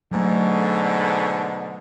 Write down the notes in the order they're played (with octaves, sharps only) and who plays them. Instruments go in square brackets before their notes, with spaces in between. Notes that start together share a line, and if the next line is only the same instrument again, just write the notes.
[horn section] G#2 B2 D3 [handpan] F#3 A3